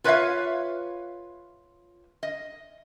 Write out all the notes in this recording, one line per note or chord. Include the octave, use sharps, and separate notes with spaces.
F4 B4 C#5 D5 E5 F5
D#5